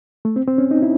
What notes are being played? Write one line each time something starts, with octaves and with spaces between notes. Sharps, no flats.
A3
C4
C4
C#4
D#4
E4